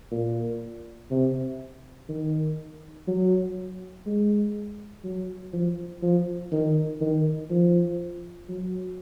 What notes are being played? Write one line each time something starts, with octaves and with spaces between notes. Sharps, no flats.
A#2
C3
D#3
F#3
G#3
F#3
F3
F3
D#3
D#3
F3
F#3